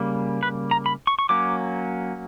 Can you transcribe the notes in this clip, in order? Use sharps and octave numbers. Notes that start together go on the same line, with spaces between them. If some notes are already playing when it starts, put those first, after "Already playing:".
Already playing: C#3 G3 A#3
B4
A#5
B5
C#6
C#6
F#3 A#3 C#4 D6